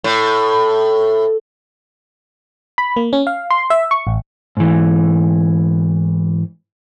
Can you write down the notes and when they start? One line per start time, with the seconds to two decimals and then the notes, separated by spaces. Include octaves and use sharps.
0.04 A2
2.78 B5
2.96 A#3
3.13 C#4
3.27 F5
3.50 C6
3.70 E5
3.91 C#6
4.07 A1
4.57 G#2 E3